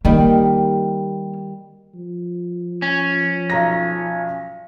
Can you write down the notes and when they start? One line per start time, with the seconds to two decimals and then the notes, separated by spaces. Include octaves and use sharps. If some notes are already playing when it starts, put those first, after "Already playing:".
0.05 D#3 G3 A#3
1.94 F3
2.82 C#4
3.50 B1 A#5 A#6